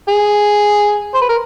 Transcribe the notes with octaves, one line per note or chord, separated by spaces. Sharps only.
G#4
C5
B4
A#4